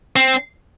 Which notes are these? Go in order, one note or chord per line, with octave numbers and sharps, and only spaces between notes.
C4